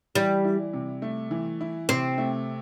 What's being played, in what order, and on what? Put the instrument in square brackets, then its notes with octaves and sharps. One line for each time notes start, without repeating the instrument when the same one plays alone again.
[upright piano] E3 [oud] G3
[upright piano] E4
C3
A3
E3
E4
[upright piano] C3 [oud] C4
[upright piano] A3